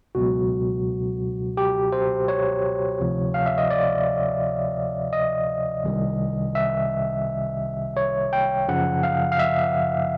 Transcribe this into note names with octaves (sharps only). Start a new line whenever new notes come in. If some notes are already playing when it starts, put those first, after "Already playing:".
C#2 B2 F#3 F#4
G4
C5
C#5
D2 C3 F3
F5
E5
D#5
D5
D#5
C2 C3 D#3 G3
E5
C#5
G5
F#2 C#3 F3 F#5
F5
F5
E5